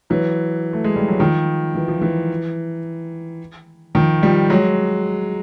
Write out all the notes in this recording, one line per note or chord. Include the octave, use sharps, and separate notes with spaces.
E3 F#3
A3
G#3
G3
F#3
D#3 F3
E3
F3
E3
D#3 F3
F3 G3
F#3 G#3